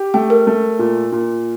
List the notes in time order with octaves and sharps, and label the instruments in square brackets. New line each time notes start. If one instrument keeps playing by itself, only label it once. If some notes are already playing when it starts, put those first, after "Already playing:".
Already playing: [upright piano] G4
[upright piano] A3 [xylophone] G5
[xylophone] A#4
[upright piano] A3
A#2
A#2